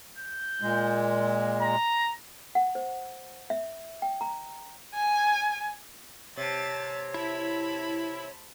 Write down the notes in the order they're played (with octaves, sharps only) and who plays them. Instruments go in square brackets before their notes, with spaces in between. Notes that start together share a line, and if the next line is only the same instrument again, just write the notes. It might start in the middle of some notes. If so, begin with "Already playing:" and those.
[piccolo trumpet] G6
[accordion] A#2 G#3
[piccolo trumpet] A#5
[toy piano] F#5
C5
E5
G5
A#5
[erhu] G#5
[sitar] C3 [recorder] C#5 [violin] A5 A6
[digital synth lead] E4 [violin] A5 B5